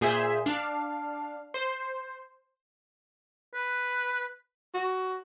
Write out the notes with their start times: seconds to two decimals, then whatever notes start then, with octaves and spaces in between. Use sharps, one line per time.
0.01 A#2 G#4 C5 E5
0.46 D4 F5
1.54 C5
3.54 B4
4.74 F#4